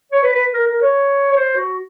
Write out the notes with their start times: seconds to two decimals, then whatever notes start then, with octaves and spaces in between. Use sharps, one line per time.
0.12 C#5
0.23 B4
0.34 B4
0.54 A#4
0.67 A#4
0.82 C#5
1.32 C#5
1.36 C5
1.56 F#4